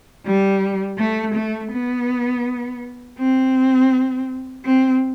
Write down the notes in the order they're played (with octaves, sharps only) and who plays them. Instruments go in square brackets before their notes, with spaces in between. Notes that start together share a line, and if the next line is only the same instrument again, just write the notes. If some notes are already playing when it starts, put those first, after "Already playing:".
[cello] G3
A3
A3
B3
C4
C4